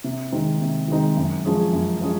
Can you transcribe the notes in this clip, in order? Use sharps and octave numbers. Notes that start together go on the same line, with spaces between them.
C3
D#3 G#3 C4 D#4
C3
D#3 G#3 C4 D#4
F#2
F3 G#3 C#4 G#4
F#2
F3 G#3 C#4 G#4